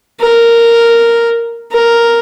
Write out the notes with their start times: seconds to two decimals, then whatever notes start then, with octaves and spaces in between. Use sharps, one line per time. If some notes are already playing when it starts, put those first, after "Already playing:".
0.21 A#4
1.72 A#4